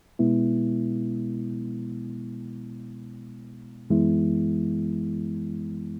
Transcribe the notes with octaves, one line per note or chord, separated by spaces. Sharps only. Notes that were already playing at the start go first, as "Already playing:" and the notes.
B2 G#3 B3 E4
F#2 E3 G#3 B3 E4